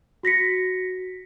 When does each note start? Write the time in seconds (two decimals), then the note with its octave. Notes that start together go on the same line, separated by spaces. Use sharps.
0.23 F#4 A#6 B6 C#7